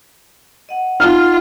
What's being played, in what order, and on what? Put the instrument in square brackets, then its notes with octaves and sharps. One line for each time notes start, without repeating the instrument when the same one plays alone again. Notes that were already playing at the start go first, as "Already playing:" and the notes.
[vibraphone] D#5 F#5
[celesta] D#4 [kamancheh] F4 [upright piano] F6